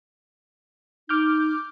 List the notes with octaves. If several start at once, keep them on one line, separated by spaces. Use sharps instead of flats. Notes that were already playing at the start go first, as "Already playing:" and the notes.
D#4 D6 F6 G6